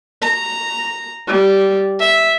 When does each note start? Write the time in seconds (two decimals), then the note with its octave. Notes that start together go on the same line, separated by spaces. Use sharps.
0.22 A#5
1.27 G3
1.99 E5